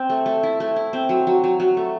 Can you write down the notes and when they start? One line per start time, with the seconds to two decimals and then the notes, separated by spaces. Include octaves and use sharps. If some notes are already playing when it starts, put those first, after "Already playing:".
Already playing: C4
0.10 A3
0.26 A3
0.43 E4
0.60 A3
0.76 E4
0.93 C4
1.09 F#3
1.27 F#3
1.44 F#3
1.60 F#3
1.77 A3